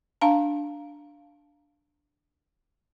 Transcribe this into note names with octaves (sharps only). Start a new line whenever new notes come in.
D4 F5 A5 A#5